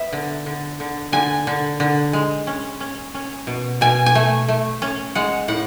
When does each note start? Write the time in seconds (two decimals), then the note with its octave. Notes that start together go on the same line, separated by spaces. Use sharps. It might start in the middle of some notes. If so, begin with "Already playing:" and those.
Already playing: B3 E5
0.13 D3
0.46 D3
0.80 D3
1.12 D3 G#5
1.47 D3
1.80 D3
2.13 G#3
2.47 C#4
2.80 C#4
3.14 C#4
3.47 B2
3.81 B2 G#5
4.06 G#5
4.15 A3
4.49 A3
4.82 C#4
5.15 G#3 F#5
5.48 A2 F#5